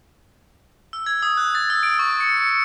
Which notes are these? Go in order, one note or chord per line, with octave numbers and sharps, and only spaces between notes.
E6
G#6
D#6
F#6
A6
E6
D7
C#6
C#7
C#7
C#7